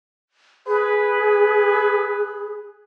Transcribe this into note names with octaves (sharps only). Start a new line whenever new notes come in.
G#4 B4